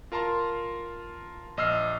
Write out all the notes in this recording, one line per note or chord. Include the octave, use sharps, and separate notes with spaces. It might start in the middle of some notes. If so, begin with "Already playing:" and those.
F4 A#4 A5 A#5 C6
A#1 D#5 E6 F6 C7